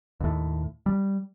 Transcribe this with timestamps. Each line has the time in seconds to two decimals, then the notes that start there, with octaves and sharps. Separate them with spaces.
0.20 D#2 A2
0.86 G3